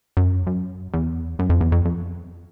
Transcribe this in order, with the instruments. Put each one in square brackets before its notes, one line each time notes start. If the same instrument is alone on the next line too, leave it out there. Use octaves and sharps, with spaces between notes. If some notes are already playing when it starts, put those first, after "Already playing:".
[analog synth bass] F#2
F#2
E2
F#2
F2
E2
F2
F2